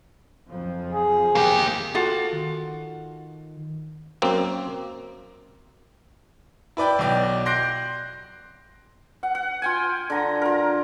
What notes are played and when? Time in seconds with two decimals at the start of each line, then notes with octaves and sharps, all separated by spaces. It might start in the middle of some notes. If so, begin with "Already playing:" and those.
0.48 F#1 F2 F3
0.92 G#4
1.35 C3 A#3 G4
1.94 F4 F#4 A4
2.33 D#3
4.22 F#2 A#3 C4
6.77 E4 B4 D5 G5
6.99 B1 B2 D5 G5
7.46 C6 F#6 G6 A#6 C7 D7
9.23 F#5
9.35 F#5
9.62 F4 G5 G#5
10.10 D3 A#5
10.42 F4 A#4